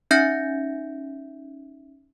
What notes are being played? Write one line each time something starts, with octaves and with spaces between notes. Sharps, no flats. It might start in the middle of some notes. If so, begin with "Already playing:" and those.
C#4 D#4 E5 G6 A#6 C#7